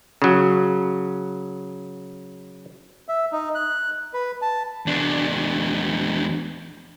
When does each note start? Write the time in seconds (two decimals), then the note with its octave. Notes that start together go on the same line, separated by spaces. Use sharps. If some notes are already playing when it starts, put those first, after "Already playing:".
0.22 C#3 F#3
3.09 E5
3.32 D#4
3.55 F#6
4.13 B4
4.42 A5
4.86 E2 D4